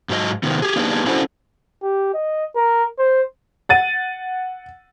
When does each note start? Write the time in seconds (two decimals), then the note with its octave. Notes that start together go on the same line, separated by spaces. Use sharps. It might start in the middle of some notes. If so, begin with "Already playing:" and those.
0.09 G#2 F#3 G#4 D#5
0.43 C3 D#3 B3
0.62 G4 G#4
0.76 A#3 B3 D4 D#4 G4 G#4
1.06 C#4 D4 E4 F#4 A4 C5
1.82 G4
2.14 D#5
2.56 A#4
2.98 C5
3.69 F#5 A6 D#7